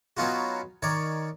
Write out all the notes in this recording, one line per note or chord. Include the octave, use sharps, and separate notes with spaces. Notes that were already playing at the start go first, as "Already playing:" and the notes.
F#3 B3 C#4 D#4 F4 F#4
D#3 C#5 D5